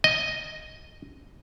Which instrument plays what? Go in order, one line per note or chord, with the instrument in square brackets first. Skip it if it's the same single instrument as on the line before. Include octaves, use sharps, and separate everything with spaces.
[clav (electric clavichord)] D#5